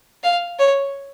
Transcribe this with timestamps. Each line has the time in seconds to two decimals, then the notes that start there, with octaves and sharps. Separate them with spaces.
0.24 F5
0.59 C#5